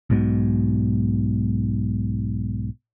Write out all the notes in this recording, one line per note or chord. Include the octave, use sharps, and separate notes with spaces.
B1 G#2 B2